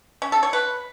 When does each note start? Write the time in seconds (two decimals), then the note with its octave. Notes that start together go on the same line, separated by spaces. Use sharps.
0.22 C#4
0.32 A4
0.43 C#5
0.53 B4